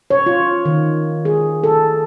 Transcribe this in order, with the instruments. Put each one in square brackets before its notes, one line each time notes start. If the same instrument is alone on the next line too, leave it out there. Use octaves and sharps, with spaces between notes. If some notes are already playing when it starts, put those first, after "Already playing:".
[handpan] C#5
F4
D#3
G#4
A4